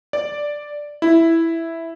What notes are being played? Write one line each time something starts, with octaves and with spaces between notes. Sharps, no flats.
D5
E4